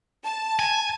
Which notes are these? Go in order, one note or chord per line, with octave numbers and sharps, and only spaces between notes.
A5
G#5